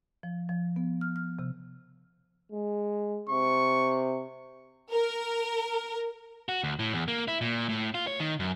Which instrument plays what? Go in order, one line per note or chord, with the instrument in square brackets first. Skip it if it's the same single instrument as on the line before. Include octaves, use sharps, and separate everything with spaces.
[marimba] F3
F3
B3
F6
F6
C3
[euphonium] G#3
[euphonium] C3 [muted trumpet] C#6
[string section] A#4
[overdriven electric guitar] F#4
D2
A2
E2
A#3
E4
A#2
A2
F4
C#5
D#3
F#2